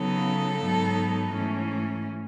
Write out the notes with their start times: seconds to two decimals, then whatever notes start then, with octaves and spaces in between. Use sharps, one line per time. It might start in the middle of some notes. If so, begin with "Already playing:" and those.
Already playing: C#3 F#3 B3 D#4 A4
0.62 G#2 F#3 B3 D#4
1.34 G#2 E3 A3 C#4